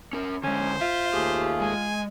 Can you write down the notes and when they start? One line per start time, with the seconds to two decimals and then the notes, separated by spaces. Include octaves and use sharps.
0.13 C#4 A#4
0.44 D3 G#3 C#4 C5
0.81 F4 E5
1.14 D#2 A3 G4 G#4
1.61 G#3 G#5